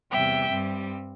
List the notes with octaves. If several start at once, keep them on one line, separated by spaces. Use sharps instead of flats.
E2 C3 G3 E5 G5
G2 G3 C4